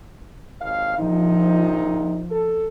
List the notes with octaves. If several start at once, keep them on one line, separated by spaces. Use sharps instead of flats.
G#1 D#2 F5
A#1 C3 F3 D#4
A4